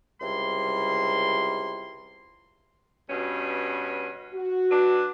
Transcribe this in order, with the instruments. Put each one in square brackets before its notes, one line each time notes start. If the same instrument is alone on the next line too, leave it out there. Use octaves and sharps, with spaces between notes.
[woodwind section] C#2 C3 G3 E4 C6
[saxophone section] G2 B2 C#4
[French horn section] F#4
[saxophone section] F#3 D4 B4